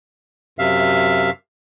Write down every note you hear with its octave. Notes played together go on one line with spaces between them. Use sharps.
F#2 C3 E5 F5